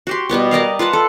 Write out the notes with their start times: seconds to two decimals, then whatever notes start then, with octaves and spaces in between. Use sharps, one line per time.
0.07 F#4 G4 C6
0.29 B2 G3 B3 G4
0.51 A#4 D5 D#5 F5
0.79 F4 B4 F#5 A5
0.93 A4